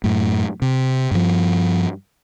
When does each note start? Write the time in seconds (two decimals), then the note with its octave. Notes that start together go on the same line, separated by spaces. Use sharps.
0.04 F#2 A2
0.62 C3
1.11 G2 F3